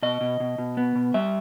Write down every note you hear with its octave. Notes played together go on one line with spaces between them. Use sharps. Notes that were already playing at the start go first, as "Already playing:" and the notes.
B2 D#5
B2
B2
B2
B3
B2
G3 E5